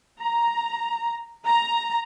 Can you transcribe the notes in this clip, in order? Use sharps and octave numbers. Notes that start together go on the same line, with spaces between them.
A#5
A#5